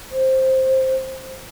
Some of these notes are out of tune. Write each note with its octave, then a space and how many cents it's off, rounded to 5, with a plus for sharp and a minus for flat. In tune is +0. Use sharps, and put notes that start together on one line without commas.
C5 +10